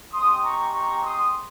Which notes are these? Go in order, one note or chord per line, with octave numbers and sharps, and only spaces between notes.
G#3 C4 G4 C6 D#6
A#5 C#6
A#5 C#6
C6 D#6